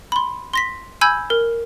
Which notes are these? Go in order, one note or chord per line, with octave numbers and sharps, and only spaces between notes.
B5 C6
C6 A#6 B6
G#5 B5 E6 G6 G#6
A#4